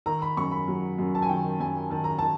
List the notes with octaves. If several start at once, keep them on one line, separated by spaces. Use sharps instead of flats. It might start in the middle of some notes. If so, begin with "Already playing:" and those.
D#3 A#5
B5
F#2 C#6
B5
F#3
F#2
A5
G#5
D#3 G5
F#2 G#5
D#3 A5
A#5
D#3 A5